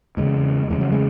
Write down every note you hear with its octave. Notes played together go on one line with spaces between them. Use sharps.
E2 C#3 G#3
E2 C#3 G#3
F#3
G#3